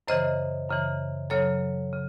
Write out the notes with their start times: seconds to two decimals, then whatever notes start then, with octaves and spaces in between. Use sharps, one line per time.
0.08 F#2 C#3 E3 C5 D#5
0.70 F#2 C#3 E3
1.30 F#2 C#3 F#3 A4 C#5
1.93 C#3